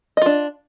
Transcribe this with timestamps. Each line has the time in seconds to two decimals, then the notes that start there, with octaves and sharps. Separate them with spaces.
0.17 D#5
0.22 F4
0.26 D4